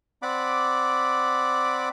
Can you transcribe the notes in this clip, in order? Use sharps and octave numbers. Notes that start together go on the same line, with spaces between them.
C4 D5 F#5 B5 D6